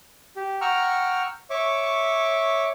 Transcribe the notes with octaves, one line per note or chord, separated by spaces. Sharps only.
G4
F#5 G5 A#5 C#6 E6 F6
C#5 E5 C#6 D6